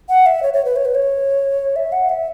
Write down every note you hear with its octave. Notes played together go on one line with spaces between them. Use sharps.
F#5
E5
C#5
C#5
B4
C#5
B4
C#5
E5
F#5
E5